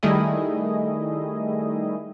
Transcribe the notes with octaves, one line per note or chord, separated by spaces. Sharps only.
D#3 G3 A3 E4 G#4 D#5